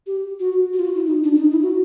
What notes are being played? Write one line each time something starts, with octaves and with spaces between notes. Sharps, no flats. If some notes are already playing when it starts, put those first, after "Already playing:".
G4
F#4
F#4
F4
F#4
E4
D#4
D4
D4
D#4
E4
F#4